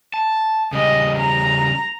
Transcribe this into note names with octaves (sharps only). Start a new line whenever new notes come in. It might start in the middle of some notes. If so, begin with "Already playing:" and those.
A5
C#3 G3 D#5
A#5